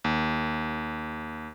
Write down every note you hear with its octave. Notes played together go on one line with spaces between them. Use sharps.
D#2